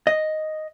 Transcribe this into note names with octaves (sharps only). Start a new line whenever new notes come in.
D#5